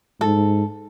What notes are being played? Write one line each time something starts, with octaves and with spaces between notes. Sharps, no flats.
G#2 A4